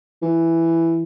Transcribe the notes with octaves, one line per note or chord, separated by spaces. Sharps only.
E3